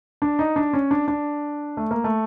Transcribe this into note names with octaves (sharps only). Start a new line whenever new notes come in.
D4
D#4
D4
C#4
D4
D4
A3
A#3
A3